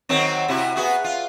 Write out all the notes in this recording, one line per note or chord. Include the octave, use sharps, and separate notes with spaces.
D#3 F#3 C4
C3 E4 F#4
B3 F#4 G#4
F4